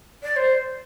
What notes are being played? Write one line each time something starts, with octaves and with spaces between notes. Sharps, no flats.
D5
C5